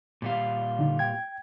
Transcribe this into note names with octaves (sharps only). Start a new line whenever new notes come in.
A#2 G3 F4
D3 D#4
G5 G#6